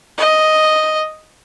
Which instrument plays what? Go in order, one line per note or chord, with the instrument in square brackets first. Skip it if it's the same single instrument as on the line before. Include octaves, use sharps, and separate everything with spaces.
[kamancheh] D#5